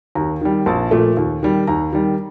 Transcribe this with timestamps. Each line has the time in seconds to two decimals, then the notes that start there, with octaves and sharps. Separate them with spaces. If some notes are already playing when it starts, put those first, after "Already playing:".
0.15 D#2 A#5
0.41 D#3 G3
0.66 A#1 A5
0.91 A#2 F3 A3
1.17 D#2
1.43 D#3 G3
1.67 D#2 A#5
1.93 D#3 G3